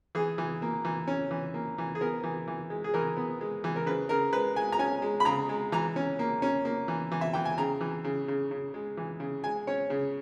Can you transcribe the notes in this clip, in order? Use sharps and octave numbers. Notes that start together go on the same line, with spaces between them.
E3 G#4
E3
A#3
E3
C#4
E3
A#3
E3
G#4
B3 A#4
E3
E3
G#3
G#4
E3 A#4
B3
G#3
E3
A#4
C#3 B4
C#3 A#4
G#3 B4
G#3 G#5
A#5
C#4 G#5
G#3
B5
C#3 A#5
G#3
E3 A#5
C#4
A#3
C#4
A#3
E3
E3
E5
E3 G5
G#5
C#3 A#5
E3
C#3
C#3
C#3
G#3
E3
C#3
G#3 G#5
C#4 C#5
C#3